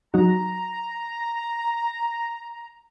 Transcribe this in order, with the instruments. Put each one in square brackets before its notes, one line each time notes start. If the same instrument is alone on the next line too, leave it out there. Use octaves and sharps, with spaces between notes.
[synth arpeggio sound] F#3 D#4 F#4 [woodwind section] A#5